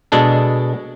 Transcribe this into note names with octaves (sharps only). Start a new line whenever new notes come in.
B2 G#3 D4 A4